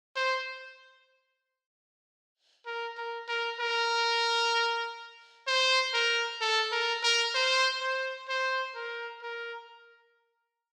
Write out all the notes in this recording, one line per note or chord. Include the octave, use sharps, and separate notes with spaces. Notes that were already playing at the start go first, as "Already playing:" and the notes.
C5
A#4
A#4
A#4
A#4
C5
A#4
A4
A#4
A#4
C5
C5
C5
A#4
A#4